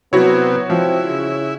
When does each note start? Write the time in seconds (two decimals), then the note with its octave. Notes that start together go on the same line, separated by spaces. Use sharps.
0.13 C3 F#3 B3 E4 F#4 C#5
0.70 F3 C4 E4
1.06 C#3